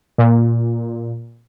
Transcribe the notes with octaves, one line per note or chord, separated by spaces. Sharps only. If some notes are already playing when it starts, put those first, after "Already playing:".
A#2